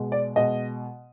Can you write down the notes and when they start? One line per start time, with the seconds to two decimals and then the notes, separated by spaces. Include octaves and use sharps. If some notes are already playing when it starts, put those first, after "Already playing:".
Already playing: B2 G#3
0.12 D5
0.36 B2 G#3 D#5